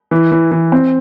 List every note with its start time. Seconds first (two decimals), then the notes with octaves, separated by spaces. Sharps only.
0.11 E3
0.32 E3
0.51 E3
0.72 C4